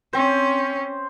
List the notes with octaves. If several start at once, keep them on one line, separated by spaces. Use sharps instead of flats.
C4 C#4 C5